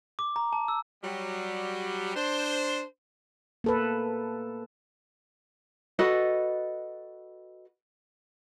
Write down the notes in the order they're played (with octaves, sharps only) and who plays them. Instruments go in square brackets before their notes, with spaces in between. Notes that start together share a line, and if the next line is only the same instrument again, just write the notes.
[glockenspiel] D6
A#5
A5
E6
[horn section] F#3 G3
D4 C5
[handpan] A#3 A4 B4
[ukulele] F#4 A4 B4 D#5